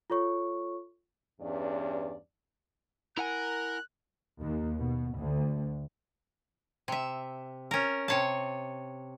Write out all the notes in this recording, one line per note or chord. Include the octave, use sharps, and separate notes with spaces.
F4 A4 C#5 C#6
E2 G2 C#4 D5
E4 A#4 F#5 G#5 F#6
D#2
B2
D2
C3 E5
C#4 A#4
C3 C#5 A5